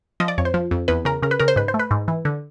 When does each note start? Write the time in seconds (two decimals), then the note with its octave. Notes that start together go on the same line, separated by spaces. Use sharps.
0.20 F3 D#5
0.28 D5
0.38 F2 C#5
0.45 C5
0.54 F3
0.71 F2
0.88 E2 B4
1.05 C#3 A#4
1.22 C#3 A#4
1.31 B4
1.40 C#3 A#4
1.48 C5
1.56 G#2 B4
1.68 C5
1.74 A3
1.79 B4
1.91 G#2
2.08 E3
2.25 D3